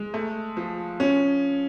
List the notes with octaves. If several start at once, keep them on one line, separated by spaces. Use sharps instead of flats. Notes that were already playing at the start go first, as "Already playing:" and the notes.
Already playing: G#3
A3
F3
C#4